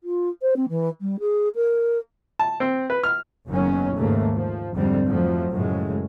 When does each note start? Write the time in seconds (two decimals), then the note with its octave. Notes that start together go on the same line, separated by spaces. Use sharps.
0.04 F4
0.42 C5
0.56 C4
0.69 E3
1.01 G3
1.20 G#4
1.55 A#4
2.39 A5
2.60 C4
2.90 B4
3.04 F6
3.48 F#1 F#2 D#3 F#3 B3 C#4
3.96 D#2 G#2 C#3 A3 A#3
4.35 F3
4.74 F2 G#2 D3 G3 C4
5.07 F2 F3 F#3 A3
5.51 F#2 A2 C#3 G#3